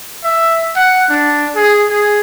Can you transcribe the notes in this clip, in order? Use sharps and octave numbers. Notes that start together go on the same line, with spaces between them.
E5
F#5
D4
G#4
G#4